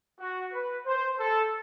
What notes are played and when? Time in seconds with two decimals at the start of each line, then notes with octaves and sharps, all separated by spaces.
0.20 F#4
0.53 B4
0.86 C5
1.18 A4